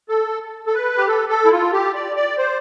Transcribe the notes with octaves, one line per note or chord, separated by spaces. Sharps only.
A4
A4
B4
G4
A4
A4
E4
F4
G4
D5
D5
C5